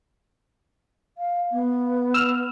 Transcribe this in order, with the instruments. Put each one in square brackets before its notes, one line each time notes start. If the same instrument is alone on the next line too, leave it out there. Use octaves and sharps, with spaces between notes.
[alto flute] F5
B3
[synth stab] E6 F6